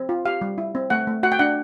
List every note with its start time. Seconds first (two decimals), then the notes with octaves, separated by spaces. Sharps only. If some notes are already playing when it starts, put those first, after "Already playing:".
Already playing: C4
0.09 F4
0.25 G4 F5
0.41 G3
0.58 E4
0.75 C4
0.90 A3 F#5
1.07 A3
1.23 F#4 F#5
1.32 G5
1.39 D4 F#5